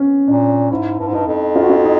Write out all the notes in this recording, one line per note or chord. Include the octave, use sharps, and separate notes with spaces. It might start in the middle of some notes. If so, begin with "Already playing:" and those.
Already playing: B3 C#4
A#2 D4
G#2 E4
G2
G#2
G2 D#4
F2
F4
F#4
F4
D#4